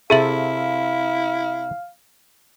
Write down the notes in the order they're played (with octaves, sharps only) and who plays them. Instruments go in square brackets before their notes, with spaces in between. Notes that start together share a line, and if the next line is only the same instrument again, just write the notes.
[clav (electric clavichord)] C3 A4 [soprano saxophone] E4 [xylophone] G#4 E5 F#7 [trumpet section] F5